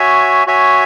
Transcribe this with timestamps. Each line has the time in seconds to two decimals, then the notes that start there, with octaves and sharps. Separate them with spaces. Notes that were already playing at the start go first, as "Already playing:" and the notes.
Already playing: F#4 C#5 E5 G#5
0.47 F#4 C#5 E5 G#5